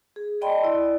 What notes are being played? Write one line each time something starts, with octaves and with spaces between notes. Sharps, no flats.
G#4
D5 D#5 G5 A5 B5 C6
E4 D5